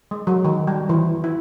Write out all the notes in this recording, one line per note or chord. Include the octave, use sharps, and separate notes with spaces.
G#3
F#3
D#3
G3
E3
E4